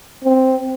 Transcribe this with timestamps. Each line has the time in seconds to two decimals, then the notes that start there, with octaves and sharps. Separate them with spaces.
0.25 C4